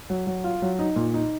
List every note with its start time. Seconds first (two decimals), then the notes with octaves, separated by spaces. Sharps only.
0.10 F#3
0.27 F#3
0.44 F4
0.62 F#3
0.79 D#4
0.96 A#2
1.14 D#4